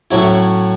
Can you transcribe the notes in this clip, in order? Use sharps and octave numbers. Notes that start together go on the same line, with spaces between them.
A2 F#3 C#4 E4